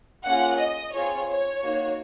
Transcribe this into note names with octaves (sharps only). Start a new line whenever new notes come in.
A#3 C#4 F4 G#4 F#5
D#5
C4 F4 G#4 C#5
C#5
A#3 D#4 F#4